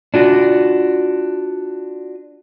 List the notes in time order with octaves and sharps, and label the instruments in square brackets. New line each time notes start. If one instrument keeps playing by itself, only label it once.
[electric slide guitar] D4 F4 F#4